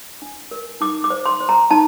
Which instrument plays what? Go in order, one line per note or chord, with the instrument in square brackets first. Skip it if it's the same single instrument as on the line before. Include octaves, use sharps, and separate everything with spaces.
[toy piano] D4
A#4
D#4 D6
D6
C5
C6
C5
A#5
D#4 A5